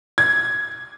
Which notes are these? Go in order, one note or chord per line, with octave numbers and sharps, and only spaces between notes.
G#6